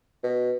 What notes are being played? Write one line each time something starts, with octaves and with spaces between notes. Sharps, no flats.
B2